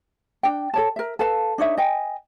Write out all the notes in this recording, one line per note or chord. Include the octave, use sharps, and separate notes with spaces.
D4 G5
A4 C#5 A5
A#4 E5
A4 B4 F5 A5
D4 D#4 C#5 E5
D#5 G5 G#5